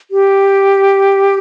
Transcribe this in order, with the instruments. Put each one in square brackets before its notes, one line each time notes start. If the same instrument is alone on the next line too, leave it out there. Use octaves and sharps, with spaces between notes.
[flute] G4